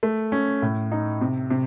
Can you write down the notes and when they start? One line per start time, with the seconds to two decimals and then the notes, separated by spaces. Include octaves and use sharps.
0.03 A3
0.32 C#4
0.62 A2
0.92 D#4
1.21 C3
1.50 C3